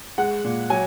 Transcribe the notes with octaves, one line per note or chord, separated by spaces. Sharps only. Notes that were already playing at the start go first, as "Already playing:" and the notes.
G#3 F#5
A#2
F#3 G#5